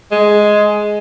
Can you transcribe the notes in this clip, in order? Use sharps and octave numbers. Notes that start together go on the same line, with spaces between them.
G#3